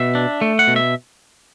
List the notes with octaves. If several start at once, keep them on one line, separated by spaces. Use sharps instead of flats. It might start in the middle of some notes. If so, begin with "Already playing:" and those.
Already playing: B2 E5
D4
A3
F#5
B2
E5